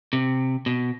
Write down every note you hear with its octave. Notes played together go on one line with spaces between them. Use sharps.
C3
B2